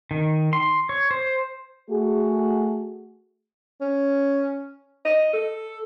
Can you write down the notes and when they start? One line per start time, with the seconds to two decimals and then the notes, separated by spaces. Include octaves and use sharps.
0.11 D#3
0.53 C6
0.89 C#5
1.11 C5
1.91 A3 F#4 G#4
3.81 C#4
5.05 D#5
5.33 A4